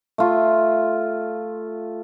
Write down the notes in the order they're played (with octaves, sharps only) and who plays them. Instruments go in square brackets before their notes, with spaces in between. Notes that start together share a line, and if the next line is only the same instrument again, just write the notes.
[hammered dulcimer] A3 F4